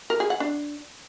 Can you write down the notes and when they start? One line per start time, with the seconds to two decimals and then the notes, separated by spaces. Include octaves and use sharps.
0.10 A#4
0.20 G#4
0.30 F#5
0.40 D4